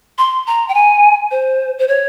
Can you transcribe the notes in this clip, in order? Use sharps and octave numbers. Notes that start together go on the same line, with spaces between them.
C6
A#5
G5
G#5
C5
C5
C#5